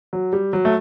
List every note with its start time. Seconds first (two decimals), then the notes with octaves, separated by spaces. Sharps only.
0.13 F#3
0.33 G3
0.53 F#3
0.65 A3